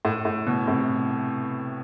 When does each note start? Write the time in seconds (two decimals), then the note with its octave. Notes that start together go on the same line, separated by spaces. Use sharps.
0.05 A2
0.25 A2
0.46 B2
0.67 A2 C3